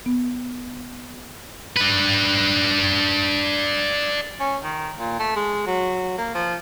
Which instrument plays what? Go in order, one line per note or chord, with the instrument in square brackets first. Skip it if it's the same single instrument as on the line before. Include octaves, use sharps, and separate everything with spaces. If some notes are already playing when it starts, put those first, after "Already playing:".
[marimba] B3
[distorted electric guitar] D4 B4
[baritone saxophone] C#4
D#3
A#2
A3
G#3
F#3
A#3
F3